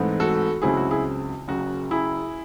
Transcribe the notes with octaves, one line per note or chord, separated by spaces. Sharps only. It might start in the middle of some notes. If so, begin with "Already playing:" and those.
Already playing: G#2 E3 A3 C4 D#4
F#4 A4
C#2 C#3 F#3 C4 E4 G#4
F#4
E4 G#4
F#1 F#2 C#3 F#4
E4 G#4